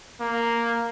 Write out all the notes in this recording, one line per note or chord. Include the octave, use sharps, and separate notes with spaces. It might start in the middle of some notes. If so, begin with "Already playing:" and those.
A#3